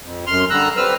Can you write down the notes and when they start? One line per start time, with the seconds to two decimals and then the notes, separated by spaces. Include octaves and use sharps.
0.03 F2
0.27 F#2 C6 F6
0.50 D3 G3 A#5 E6 F#6
0.77 G3 C4 B4 E6 F6